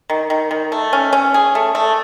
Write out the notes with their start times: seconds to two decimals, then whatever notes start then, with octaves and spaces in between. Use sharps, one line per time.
0.09 D#3
0.30 D#3
0.51 D#3
0.72 A3
0.93 C#4
1.13 C#4
1.34 G#4
1.55 A3
1.75 A3